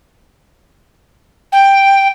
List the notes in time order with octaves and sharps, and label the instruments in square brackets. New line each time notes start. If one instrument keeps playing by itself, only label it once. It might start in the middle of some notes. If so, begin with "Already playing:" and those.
[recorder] G5